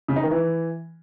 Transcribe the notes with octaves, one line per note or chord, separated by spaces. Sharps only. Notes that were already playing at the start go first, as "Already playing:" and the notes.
C#3
D#4
D#3
E3